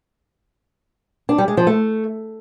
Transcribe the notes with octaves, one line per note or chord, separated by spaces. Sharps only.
D4
G3
G#3
F3
A3